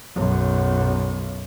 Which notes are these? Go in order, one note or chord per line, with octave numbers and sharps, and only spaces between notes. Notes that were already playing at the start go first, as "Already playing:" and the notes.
B1 F#2